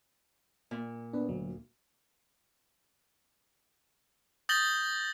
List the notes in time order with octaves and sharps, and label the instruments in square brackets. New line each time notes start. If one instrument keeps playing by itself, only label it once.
[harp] A#2
[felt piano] B3 [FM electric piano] D4 B4
[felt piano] D2 [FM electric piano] F#3
[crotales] D#6 G6 A6 A#6 F#7 G7